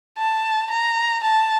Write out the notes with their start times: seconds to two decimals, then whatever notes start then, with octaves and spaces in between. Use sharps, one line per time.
0.18 A5
0.70 A#5
1.23 A5